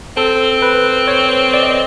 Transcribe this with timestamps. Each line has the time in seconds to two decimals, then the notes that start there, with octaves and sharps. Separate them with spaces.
0.17 C4 A4
0.62 B4
1.08 C#5
1.54 D5
1.63 D#5